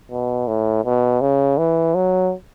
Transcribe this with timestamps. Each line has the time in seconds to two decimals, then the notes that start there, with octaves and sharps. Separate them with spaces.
0.11 B2
0.48 A2
0.85 B2
1.21 C#3
1.58 E3
1.95 F#3